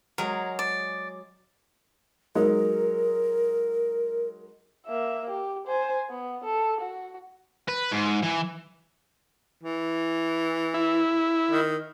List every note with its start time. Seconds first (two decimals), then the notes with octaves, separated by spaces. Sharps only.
0.18 F#3 G#3 G#4 A#4
0.59 D5
2.35 F#3 G#3 D#4 A#4
4.87 A#3 E5
5.30 G4
5.67 C5 G#5
6.10 B3
6.44 A4
6.81 F#4
7.69 B4
7.92 G#2
8.23 E3
9.63 E3
10.74 E4
11.51 D#3